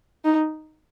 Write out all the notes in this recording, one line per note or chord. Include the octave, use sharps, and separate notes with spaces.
D#4